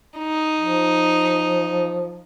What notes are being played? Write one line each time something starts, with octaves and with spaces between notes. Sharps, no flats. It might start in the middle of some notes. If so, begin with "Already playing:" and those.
D#4
F3